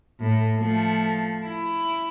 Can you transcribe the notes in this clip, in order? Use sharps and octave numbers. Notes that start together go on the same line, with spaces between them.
A2
F3 A3
E4